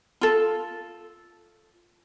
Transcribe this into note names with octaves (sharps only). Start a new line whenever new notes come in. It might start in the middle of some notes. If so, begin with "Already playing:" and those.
F4 A4